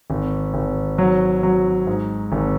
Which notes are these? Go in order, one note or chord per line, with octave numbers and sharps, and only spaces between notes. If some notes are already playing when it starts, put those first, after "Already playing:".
G#1
G#1
F#3
F#3
G#2
G#1